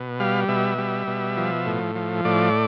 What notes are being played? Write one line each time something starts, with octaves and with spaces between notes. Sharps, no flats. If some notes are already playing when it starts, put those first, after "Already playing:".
Already playing: B2
G3 F5
B2 E5
G3
B2
F3
A2
F3
A2 D5